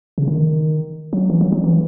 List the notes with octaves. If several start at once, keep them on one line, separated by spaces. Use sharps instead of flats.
C#3
D#3
F#3
E3
F#3
F#3
E3